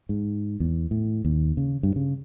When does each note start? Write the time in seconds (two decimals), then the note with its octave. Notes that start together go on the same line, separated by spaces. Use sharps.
0.09 G#2
0.60 E2
0.91 A2
1.25 D#2
1.57 C#3
1.83 G2
1.96 C#3